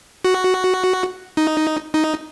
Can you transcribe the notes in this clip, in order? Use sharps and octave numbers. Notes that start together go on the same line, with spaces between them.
F#4
D#4
D#4